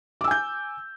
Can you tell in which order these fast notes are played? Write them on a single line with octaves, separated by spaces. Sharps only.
D6 E6 G#5 G6